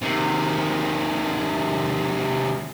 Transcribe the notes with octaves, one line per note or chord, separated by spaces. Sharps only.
C3 D#3